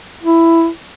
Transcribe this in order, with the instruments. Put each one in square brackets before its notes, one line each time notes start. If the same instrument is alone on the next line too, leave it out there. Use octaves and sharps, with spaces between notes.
[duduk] E4